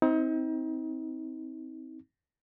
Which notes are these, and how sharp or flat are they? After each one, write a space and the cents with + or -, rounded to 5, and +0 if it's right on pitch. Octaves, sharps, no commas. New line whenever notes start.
C4 +0 D#4 +35